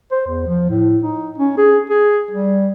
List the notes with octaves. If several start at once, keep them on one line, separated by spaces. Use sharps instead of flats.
C5
E2
F3
A2
D#4
C#4
G#4
G#4
G3